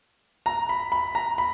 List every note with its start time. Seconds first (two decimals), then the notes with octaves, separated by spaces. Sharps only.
0.46 A#5
0.69 B5
0.92 B5
1.15 A#5
1.38 B5